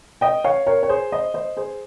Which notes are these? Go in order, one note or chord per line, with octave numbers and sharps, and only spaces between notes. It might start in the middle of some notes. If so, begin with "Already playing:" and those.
D#5 G5
C#5 F5
A#4 C#5
C#5
G#4 C5
C5 D#5
C5 D#5
G#4 C5